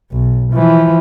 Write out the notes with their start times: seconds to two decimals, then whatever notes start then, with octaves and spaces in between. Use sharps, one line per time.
0.12 B1
0.53 E3 F3